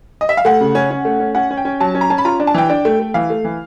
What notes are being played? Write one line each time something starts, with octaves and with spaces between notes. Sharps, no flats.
D#5
E5
F5
A3 F#5
C#3
C#4
C#4
A3
C#4
C#4 F#5
C#4
G5
C#4
F#3 A5
C#4
A#5
C#4 A5
B5
F4 A#5
D4
A5
E3 G5
D4
A3
A3
E3 F5
A3
E3